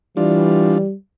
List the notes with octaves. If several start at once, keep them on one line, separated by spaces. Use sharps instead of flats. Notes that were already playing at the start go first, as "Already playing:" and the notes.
E3 G3 D4 F4